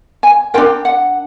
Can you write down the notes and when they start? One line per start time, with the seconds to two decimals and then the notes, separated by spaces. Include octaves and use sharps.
0.23 G#5
0.54 D4 F4 A#4 G5
0.85 F#5